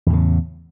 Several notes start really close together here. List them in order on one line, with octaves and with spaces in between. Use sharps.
E2 A2 C#3